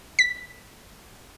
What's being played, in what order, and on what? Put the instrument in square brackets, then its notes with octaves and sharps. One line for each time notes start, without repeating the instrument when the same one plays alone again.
[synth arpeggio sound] B6